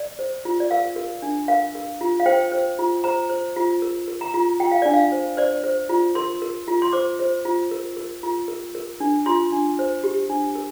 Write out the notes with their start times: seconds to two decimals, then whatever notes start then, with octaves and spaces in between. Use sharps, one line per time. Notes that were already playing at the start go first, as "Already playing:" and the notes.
Already playing: D5
0.19 C5
0.45 F4
0.60 D5
0.71 A#4 F5
0.96 A#4
1.22 D4
1.48 A#4 F5
1.75 A#4
2.01 F4
2.20 F5
2.26 C5 G5
2.52 C5
2.79 F4
3.04 C5 A#5
3.30 C5
3.56 F4
3.82 A#4
4.08 A#4
4.21 A#5
4.34 F4
4.60 F4 G5
4.72 F5
4.82 D4 D5
4.93 F5
5.12 C5
5.37 C5 D5
5.64 C5
5.89 F4
6.15 A#4 C6
6.42 A#4
6.68 F4
6.82 C6
6.93 C5 D6
7.19 C5
7.45 F4
7.71 A#4
7.97 A#4
8.23 F4
8.48 A#4
8.75 A#4
9.00 D4
9.26 F4 C6
9.52 D4
9.79 C5
10.04 G4
10.30 D4
10.56 A#4